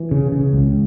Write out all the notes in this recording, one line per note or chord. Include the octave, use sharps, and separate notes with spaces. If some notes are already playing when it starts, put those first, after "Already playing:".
Already playing: E3
C#3
C#3
C#2